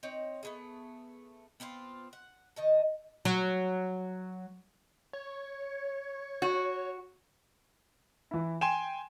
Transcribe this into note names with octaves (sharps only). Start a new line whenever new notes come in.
C4 D#4 C#5
A3 B3 G#4
B3 C4 F4 C5
F#5
D#3 D#5 A5
F#3
C#5
F#4
E3 E4
G5 G#5 C6 E7